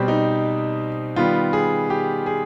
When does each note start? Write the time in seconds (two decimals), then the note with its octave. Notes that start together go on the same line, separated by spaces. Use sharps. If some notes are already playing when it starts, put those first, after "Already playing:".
Already playing: B2 G3 C4 G4
0.08 D#4
1.16 D#3 G3 B3 F4
1.53 G#4
1.90 G4
2.26 G#4